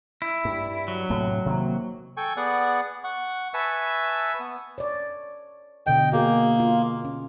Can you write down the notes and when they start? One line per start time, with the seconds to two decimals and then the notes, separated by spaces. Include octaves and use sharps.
0.22 E4
0.45 G2
0.88 F#3
1.10 A2 C3 A3
1.46 C3 D#3 A#3
2.17 A4 G5 G#5 C#6
2.37 B3 G#4 D5 F#5
3.04 F#5 C#6
3.54 B4 E5 G#5 A5 C#6 E6
4.40 B3
4.78 C#5 D5
5.87 B2 D3 D#5 G5
6.13 A#3 F#4 G#4
6.60 F4
7.05 C#4